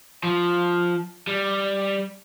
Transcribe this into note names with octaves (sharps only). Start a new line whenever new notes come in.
F3
G3